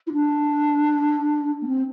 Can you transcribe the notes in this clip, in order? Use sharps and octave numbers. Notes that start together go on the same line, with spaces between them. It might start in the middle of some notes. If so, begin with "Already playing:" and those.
E4
D4
A#3
C4